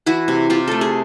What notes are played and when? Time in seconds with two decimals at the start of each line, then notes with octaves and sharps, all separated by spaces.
0.06 E3 E4 F#4
0.28 C3
0.50 C3 F4 G4
0.68 A3 A4
0.81 G#4